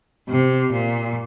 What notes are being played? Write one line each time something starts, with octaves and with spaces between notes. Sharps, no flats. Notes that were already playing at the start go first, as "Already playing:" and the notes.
C3
A#2